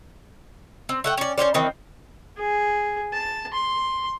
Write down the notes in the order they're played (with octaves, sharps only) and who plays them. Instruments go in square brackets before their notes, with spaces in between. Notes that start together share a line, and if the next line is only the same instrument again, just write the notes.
[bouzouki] C4
A3 F#5 G5
C#4 D5
C#4 F4 C5 D5
D#3 E3 C4
[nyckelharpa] G#4
A5
C6